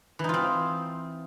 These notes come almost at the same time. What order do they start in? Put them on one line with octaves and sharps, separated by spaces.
E3 D#4 F4 C4